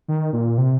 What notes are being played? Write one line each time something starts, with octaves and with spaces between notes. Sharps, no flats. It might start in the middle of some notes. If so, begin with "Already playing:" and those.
D#3
A#2
C3